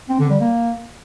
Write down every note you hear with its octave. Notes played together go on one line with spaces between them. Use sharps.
C4
D3
G3
A#3